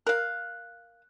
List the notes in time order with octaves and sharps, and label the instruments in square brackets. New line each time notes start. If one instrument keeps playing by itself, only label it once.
[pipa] A#4 F5 [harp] F#6